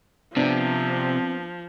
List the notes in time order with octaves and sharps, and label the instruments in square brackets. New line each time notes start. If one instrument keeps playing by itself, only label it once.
[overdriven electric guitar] C3 [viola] F3 [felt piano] B3 D4 [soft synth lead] C4